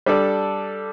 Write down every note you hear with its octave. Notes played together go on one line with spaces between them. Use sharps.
G3 D4 A4